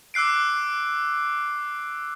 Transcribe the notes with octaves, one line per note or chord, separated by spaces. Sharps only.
D6 E6 F#6 C7 D7